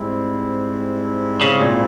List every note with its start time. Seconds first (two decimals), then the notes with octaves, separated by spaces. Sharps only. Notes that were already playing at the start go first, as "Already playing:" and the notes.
Already playing: G#2 G3 C4 E4
1.41 C#3
1.60 A#2